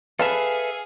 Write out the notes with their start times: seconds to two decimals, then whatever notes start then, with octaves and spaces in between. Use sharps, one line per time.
0.19 G#4 A4 B4 E5 F5 A5